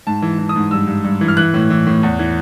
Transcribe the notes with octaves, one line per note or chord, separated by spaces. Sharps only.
G#2 A5
E3
E3
D#6
G#2
G2 E6
G2
G2
E3
F6
E3 F#6
A2
E3
A2
E2
E3